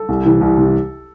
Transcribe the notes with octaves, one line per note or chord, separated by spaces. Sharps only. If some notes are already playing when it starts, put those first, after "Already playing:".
Already playing: A4
C2
C3 E3
C2
C3 E3